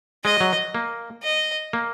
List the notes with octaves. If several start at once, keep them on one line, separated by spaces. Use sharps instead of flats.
G#3 D#5
F#3
A#3
D#5
A#3